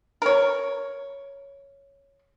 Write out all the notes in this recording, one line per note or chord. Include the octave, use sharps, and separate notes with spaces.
A#4 C#5